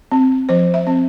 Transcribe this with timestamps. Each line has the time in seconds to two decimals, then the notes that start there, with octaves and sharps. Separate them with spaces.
0.12 C4
0.49 F3 C5
0.74 E5
0.87 C4